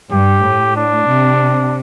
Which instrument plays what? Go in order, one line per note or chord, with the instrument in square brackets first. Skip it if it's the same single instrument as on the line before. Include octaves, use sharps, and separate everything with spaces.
[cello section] G2 [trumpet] G4
[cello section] A2
[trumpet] D4
[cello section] C3